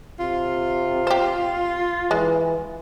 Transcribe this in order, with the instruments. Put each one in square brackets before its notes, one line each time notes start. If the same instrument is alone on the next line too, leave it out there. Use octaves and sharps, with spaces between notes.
[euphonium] C3 [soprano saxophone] F4
[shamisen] G4 C5
[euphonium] E3 [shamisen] G#3